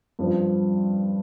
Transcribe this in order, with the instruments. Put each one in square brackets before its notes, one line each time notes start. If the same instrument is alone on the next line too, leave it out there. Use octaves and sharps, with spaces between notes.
[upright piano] G2 F3 C4